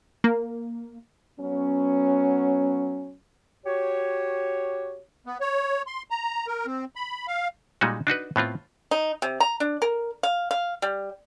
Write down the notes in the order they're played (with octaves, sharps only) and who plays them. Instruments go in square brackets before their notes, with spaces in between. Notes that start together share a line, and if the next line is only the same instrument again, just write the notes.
[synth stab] A#3
[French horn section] F#3 B3 C#4
[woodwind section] F#4 G4 C#5
[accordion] B3
C#5
C6
A#5
A#4
C4
B5
F5
[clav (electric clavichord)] A#2 G3 G#3 D#4 F#4
D4 D#4 F#4 B4
A2 B3 C4 F4
[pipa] D#4
C3
A#5
D4
A#4
F5
F5
G3